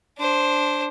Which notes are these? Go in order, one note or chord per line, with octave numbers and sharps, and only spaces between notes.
D4 C5